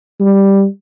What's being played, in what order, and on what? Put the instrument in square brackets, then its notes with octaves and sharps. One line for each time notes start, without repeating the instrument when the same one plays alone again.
[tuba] G3